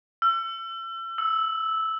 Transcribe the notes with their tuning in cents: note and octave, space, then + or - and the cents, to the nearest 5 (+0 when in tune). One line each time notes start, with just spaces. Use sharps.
E6 +35
E6 -10